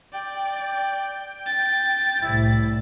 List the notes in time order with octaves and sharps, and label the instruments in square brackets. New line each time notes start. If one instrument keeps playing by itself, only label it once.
[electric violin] D5 [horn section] G5
[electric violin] A6
[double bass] C2 A2 [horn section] E4